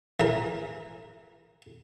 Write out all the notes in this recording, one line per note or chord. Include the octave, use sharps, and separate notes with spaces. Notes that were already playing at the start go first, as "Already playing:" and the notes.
E3 A#4